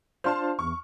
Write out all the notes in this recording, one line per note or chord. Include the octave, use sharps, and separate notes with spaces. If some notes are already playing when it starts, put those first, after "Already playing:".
D4 F4 C5 A5 C6 F6
E2 C#6